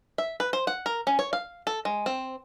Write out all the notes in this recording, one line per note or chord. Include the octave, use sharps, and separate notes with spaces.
E5
B4
C5
F#5
A#4
C#4
C#5
F5
A4
G#3
C4